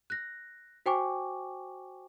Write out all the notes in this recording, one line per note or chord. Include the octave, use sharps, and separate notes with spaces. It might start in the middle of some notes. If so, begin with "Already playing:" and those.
F#6 A#6
F#4 C5 G5 G#5 C#6 D6